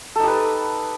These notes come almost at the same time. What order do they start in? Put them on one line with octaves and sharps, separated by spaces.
A4 D#4 G4 B4